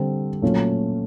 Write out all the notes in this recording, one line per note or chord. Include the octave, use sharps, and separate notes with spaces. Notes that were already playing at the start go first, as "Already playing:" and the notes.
Already playing: D3 G3 C4
A#2 F#3 A3 C#4 F4